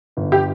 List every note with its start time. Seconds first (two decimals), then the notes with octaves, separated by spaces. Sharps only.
0.17 G1
0.32 G4